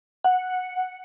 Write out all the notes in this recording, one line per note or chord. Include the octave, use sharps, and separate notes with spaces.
F#5